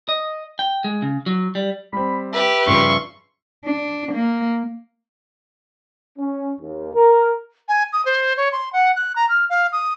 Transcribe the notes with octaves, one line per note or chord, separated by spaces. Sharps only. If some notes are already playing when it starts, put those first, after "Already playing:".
D#5
G5
G#3
C#3
F#3
G3
G3 C4 B5
G4 B4 E5
G2 C#3 F3 C6 C#6
D4
A#3
C#4
D#2
A#4
G#5
D#6
C5
C#5
C6
F#5
F#6
A#5
F6
F5
D#6